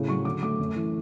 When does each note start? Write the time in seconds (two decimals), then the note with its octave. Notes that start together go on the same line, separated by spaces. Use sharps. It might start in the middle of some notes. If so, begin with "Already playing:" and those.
Already playing: A2 C#3
0.08 F#3 C#6
0.25 D3 D6
0.42 A3 D6
0.59 F#2
0.76 E3